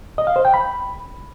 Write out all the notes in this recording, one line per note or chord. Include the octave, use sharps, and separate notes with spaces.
D#5
F5
C5
G5
B5